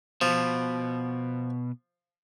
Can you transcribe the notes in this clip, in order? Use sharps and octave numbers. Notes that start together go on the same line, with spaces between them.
B2 F3